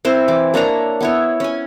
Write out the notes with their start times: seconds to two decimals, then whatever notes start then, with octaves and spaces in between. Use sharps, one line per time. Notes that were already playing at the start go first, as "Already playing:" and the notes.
0.05 C4 E4 C5
0.28 E3 D6
0.54 A#3 D4 C#5 A#5
1.01 B3 E4 C#5
1.40 C#4 G#5